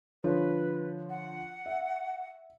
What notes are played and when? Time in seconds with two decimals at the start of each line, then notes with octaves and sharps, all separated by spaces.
0.24 D3 F3 B4 C#5
1.10 F#5
1.66 E5